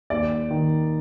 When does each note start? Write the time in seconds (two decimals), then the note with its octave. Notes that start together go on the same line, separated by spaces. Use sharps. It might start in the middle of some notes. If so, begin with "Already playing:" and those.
0.10 D#2 D5
0.50 D#3